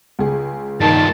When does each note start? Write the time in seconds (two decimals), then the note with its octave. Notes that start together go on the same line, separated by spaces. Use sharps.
0.19 C#2 G#4
0.81 G2 A#2 D#3 A5